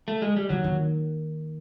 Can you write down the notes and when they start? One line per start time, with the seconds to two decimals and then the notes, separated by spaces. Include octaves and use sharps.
0.08 A3
0.22 G#3
0.37 G3
0.49 D#3 F#3
0.64 D#3